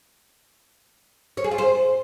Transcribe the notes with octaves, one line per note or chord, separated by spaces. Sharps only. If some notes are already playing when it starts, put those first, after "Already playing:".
C#5
G#4
F4
C5